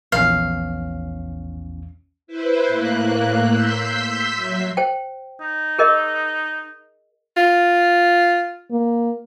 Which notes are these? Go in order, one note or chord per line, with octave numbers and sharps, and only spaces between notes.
A#1 E2 C#4 F5
E4 B4 C5
A2 A#3 F#6
C6 E6 G6 B6
F#3 E5
C5 G5
D#4
G#4 A#4 D#5
F4
A#3